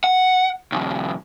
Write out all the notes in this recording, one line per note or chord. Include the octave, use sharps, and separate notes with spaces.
F#5
B1 E2